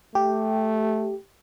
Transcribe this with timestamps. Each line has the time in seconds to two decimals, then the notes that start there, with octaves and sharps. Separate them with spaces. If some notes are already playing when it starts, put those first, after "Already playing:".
0.15 A3 G4